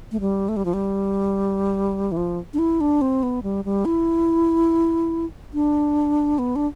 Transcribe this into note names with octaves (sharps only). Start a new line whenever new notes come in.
A3
G3
A3
G3
F3
G3
E3
F3
D4
E4
D4
C4
B3
G3
G3
E4
D4
B3
D4